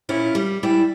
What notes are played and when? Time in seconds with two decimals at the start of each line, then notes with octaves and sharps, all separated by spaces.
0.09 A#2 C#4 E4 F4
0.35 G3
0.63 E3 G3 E4 D5